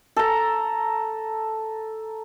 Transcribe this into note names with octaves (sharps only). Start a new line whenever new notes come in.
A4 A#5